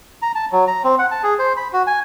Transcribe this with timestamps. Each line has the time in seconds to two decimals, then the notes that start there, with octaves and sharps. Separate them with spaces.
0.22 A#5
0.35 A5
0.52 F#3
0.67 A#5
0.84 C4
0.99 F#5
1.11 A5
1.23 G#4
1.39 C5
1.57 B5
1.73 F#4
1.87 G#5